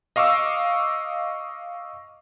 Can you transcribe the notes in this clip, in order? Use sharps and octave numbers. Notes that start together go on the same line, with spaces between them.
D#5 F5 C#6 D6 E6